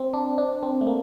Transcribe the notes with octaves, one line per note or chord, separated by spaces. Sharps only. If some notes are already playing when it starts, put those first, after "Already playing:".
Already playing: C4
D4
D4
C4
A3
A#3